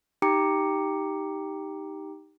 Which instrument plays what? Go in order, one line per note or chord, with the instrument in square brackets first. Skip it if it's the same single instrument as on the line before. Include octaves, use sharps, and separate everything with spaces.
[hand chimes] D#4 G4 G5 A#5 D6 C#7